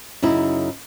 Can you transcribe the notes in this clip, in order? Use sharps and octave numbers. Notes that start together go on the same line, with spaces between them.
F#2 C#3 D#4 E4